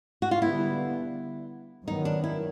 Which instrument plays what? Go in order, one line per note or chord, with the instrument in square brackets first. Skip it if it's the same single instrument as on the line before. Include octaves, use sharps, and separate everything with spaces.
[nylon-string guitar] F#4
F4
[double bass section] D3 G3 B3 [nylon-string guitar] E4
[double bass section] F#2 D#3 F#3 B3 [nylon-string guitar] D#4
[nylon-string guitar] D4
E4